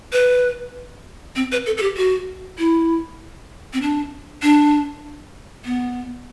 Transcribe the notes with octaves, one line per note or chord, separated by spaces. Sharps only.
B4
C4
B4
A4
A4
G4
F#4
E4
C4
D4
D4
B3